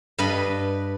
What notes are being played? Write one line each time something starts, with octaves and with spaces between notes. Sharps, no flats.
G2 B4 D#5 B5